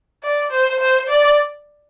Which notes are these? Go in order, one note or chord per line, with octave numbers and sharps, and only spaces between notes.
D5
C5
C5
D5